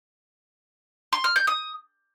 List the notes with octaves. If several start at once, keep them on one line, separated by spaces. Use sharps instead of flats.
C6
F6
G6
D#6